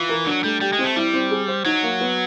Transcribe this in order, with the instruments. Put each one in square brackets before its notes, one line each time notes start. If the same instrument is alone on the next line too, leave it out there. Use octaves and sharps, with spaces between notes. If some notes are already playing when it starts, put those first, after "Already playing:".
Already playing: [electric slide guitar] E3 [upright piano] F4
[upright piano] A#4
[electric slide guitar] F#3 [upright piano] D4
[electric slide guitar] G3 [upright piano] A3
[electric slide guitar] G3 [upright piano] G4
[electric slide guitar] G#3
[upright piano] C4
[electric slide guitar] A3
[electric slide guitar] G3 [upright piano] E4
[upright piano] C4
G#4
C5
[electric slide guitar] F#3 [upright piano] D#4
[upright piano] A#3
B3